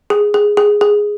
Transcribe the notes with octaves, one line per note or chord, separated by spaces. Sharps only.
G#4
G#4
G#4
G#4